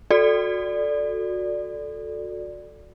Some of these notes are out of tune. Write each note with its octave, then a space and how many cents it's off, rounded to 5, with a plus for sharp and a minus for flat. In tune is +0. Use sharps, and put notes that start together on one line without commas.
F#4 -25 A4 +0 D5 +0